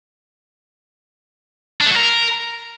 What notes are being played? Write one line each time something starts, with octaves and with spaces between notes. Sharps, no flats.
D4
A3
F#4
A#4